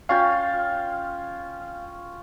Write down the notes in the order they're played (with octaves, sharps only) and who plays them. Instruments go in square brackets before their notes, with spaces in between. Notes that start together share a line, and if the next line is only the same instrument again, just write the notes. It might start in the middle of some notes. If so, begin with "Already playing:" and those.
[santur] C#4 F4 G5 [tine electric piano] F5